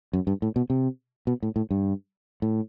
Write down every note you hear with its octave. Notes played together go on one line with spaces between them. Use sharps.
F#2
G2
A2
B2
C3
B2
A2
A2
G2
A2